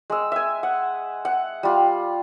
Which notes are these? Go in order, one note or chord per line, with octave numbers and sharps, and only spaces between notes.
G#3 E6
E5 G#5
F#5
F#5
G3 F4